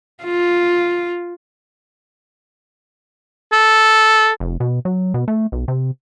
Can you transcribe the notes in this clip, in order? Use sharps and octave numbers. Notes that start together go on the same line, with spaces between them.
F4
A4
F1
B2
F#3
B2
A3
B1
C3